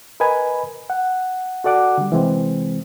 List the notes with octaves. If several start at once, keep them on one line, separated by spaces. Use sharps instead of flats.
A#4 B4 D#5 G#5 B5
F#5
F#4 A4 D5 F#5 D6
D3 G3
C3 E3 G#3 C4